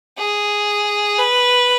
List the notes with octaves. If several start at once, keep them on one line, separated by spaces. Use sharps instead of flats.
G#4
B4